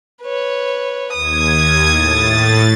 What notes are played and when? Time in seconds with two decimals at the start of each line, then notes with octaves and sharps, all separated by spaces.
0.23 B4 C#5
1.13 D#2 D#6 G#6
1.90 A2 A6